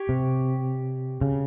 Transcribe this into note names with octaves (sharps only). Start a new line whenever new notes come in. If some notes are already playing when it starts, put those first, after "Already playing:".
Already playing: G4 C#5
C3
C#3